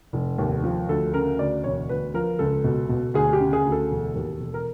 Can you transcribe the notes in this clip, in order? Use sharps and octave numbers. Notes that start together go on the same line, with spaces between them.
F1
D#2
F3
D2 A4
C#3 A#4
D2 D5
E1 C#5
D2 B4
F3 A#4
C#2 A4
B2
B2
D2 G#4
G4
C#3
G#4
D2
A4
E1
D#2
E1
A#4